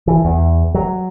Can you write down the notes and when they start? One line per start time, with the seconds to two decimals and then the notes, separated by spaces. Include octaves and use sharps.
0.07 E3
0.25 E2
0.74 F#3